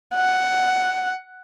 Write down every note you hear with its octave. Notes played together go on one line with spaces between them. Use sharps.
F#5